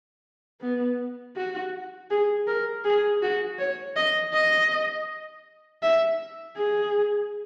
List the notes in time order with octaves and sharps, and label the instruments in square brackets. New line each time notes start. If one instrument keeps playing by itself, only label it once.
[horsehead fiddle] B3
F#4
G#4
A#4
G#4
F#4
C#5
D#5
D#5
E5
G#4